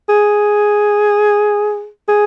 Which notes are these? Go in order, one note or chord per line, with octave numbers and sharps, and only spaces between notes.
G#4
G#4